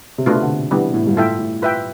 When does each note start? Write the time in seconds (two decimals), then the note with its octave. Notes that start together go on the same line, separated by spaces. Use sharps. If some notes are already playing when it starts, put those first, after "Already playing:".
0.18 C3
0.26 B2 A3 D4 F4 B4
0.36 C3
0.42 D3
0.71 E3 G3 B3 D4
0.94 A2
1.07 G2
1.16 A2 F4 A4 E5 G5
1.39 A2
1.62 F4 B4 E5 G5